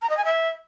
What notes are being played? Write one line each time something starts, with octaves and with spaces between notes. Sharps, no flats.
A#5
D#5
G#5
E5